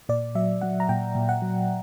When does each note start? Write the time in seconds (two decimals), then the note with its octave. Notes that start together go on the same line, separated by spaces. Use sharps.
0.09 A#2 D5
0.35 F#3 E5
0.61 F#3 F#5
0.80 A#5
0.89 A#2 G5
1.15 A#2
1.29 F#5
1.42 F#3